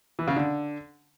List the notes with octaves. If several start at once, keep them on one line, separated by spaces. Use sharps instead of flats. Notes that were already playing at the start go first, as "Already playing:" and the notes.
E3
C#3
D3